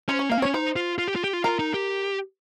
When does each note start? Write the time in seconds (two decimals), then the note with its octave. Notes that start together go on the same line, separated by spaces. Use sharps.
0.08 C#4 C5
0.19 C#5
0.29 A#3 F5
0.38 C4
0.42 C#5
0.45 C#4
0.54 D#4 C5
0.76 F4
0.98 F4
1.08 G4
1.16 F4
1.24 G4
1.33 F4
1.44 F4 A#4
1.59 D#4
1.74 G4